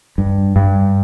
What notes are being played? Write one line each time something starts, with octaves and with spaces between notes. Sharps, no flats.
G2
G2